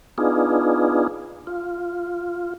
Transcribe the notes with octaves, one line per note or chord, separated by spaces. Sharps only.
B3 D4 D#4 F4 G#4
F4